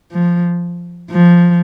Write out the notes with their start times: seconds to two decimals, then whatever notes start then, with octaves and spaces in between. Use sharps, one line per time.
0.11 F3
1.10 F3